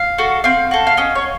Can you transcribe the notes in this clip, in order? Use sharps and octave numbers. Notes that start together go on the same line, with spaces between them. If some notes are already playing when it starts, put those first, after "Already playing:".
Already playing: F5
F#4 A4
C4 F5
F#4 A4
F5
C#4 D#5
C#5